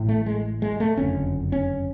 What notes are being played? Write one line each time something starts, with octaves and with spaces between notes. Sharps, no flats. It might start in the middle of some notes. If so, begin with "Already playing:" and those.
Already playing: A1 A2
A3
G#3
G#3
A3
F#1 F2 D3 C#4
C#4